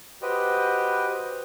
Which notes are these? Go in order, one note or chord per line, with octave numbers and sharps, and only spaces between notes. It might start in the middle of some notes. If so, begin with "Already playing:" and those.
F#4 G4 B4 C5 D#5 G5